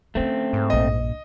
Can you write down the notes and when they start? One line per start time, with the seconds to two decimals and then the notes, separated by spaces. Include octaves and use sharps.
0.15 D3 A3 C4 C#4
0.53 G#2
0.70 A#1 G2 D#5